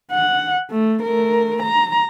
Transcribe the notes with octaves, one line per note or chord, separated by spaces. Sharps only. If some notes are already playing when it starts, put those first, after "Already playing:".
F#5
A3
A3 A#4
A#5